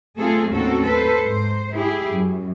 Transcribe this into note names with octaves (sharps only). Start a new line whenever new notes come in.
A3 C4 F4 G#4 A4
D#2 A2 C4 C#4 F#4 A4
A4 B4 C5
G#2 C5
E4 G4 G#4
F#2